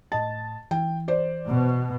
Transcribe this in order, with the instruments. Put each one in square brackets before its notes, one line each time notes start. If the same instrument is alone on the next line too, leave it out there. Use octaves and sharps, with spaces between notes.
[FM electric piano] A2 D#5 A6 [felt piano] A5
[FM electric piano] E3 [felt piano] G5
[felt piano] C5 D5
[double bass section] B2